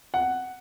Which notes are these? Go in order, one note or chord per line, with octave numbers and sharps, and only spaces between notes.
F#5